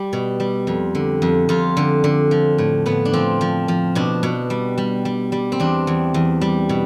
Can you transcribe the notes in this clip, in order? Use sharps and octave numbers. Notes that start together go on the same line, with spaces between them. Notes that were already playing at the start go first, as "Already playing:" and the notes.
Already playing: G3 G4
B2
G3
F2
D3
F2
F2 F4
D3
D3
F3
A2
A2 B3
D4
F3 C4
F3
F3
B2 D4
B2
G3
G3
G3
G3
C4
E2 D4
E2
E2
G3
B2